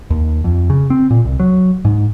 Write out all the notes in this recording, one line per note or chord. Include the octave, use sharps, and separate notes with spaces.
D#2
F2
C#3
C4
A#2
C2
F#3
G#2